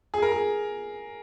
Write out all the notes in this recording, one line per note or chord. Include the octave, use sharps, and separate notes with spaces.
G#4
A#4
G#4